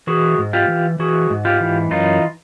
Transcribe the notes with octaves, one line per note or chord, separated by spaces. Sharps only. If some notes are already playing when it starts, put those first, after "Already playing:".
E3 F#4 G#4
G#2
F4 G4
E3
E3 F#4 G#4
G#2
F4 G4
E3
F#2 D#4 F4